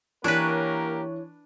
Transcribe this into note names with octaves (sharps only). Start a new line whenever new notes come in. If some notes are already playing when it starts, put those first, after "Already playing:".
E3 A#3 D4 G4 A#4 B4 C#5